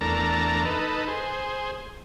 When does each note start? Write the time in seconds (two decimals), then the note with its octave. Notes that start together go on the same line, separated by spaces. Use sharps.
0.01 E2 A3 D4 A#4 A5 A#5
0.65 D#4 A4 B4
1.08 G#4 C5